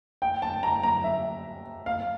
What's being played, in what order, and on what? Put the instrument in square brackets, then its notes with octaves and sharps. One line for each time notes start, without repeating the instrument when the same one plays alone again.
[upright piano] G5
A5
A#5
A#5
E5
F5